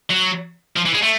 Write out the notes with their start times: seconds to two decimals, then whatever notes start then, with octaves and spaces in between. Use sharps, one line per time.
0.10 F#3
0.77 F3
0.86 E3
0.94 G#3
1.02 A3